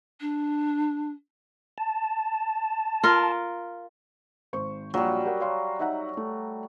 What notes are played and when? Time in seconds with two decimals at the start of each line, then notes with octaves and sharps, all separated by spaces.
0.20 D4
1.78 A5
3.03 F4 A#4
4.53 G#1 C5 C#6
4.94 A#1 F#3 G3 F4
5.25 G4 A#4 F#5
5.40 C#5 F5 C6
5.79 D#4 E5 F#5
6.17 A3